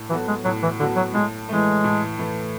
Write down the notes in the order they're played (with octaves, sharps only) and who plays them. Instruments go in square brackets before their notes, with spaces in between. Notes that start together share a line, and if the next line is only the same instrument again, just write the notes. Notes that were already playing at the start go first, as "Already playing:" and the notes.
Already playing: [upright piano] A2
[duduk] E3 [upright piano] F#3 B3 F#4 A4
[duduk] G#3
[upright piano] A2 [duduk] F#3
[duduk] E3
[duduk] D3 [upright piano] F#3 B3 F#4 A4
[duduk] F#3
[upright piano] A2 [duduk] G#3
[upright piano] E3 A3 [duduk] G#3
[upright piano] A2
E3 A3